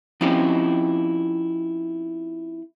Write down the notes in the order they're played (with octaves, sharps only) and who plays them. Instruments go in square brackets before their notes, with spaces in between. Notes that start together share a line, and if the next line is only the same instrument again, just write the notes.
[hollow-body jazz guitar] F3 C4 C#4 D#4 E4 G4